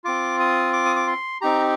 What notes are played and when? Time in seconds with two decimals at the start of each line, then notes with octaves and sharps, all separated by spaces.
0.04 C4 F4 D6
0.40 D#6
0.73 D6
0.85 D#6
0.96 D6
1.07 C6
1.41 C4 D#4 G4 A#5